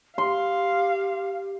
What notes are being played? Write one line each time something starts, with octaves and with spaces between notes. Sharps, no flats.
G4 F5 C6